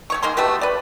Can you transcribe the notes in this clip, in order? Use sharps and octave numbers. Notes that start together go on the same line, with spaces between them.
A3 C#5 C#6
D#3 A#3 G#4 C6
A3 F#4 G4 B4
B4 D5